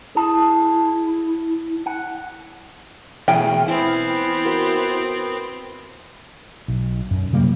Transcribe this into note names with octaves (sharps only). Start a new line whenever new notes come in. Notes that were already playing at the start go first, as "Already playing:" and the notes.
E4 G#4 A5
F#5
B2 E3 A3 G#4 G5 G#5 F6
B3 C4 E4
F#4 A#4
B1
F#2
C3 F#3 G3 A#3